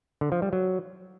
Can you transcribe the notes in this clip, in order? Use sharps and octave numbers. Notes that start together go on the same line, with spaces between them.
D3
F3
G3
F#3